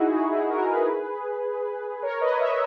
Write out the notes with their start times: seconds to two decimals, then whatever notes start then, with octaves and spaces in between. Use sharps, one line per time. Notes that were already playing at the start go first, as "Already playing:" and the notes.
Already playing: D#4 E4 F#4 G#4
0.11 D#4 F#4
0.31 E4 G#4
0.50 F#4 A#4
0.69 G#4 B4
2.03 A#4 C#5
2.21 B4 D#5
2.40 C#5 E5